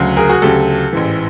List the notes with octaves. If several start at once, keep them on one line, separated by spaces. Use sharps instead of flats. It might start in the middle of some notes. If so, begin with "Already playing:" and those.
Already playing: D2 C#3 F#3
G#4 A#4
F#4 G#4
D2 C#3 F#3 G4 A4
A1 G#2 E3